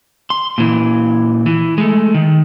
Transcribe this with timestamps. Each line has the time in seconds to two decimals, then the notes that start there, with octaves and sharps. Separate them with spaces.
0.30 C6
0.58 A#2 E3
1.46 E3
1.78 G#3 A3
2.14 D#3